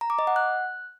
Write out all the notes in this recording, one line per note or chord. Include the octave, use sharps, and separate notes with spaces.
A#5
D6
D#5
F#5
F#6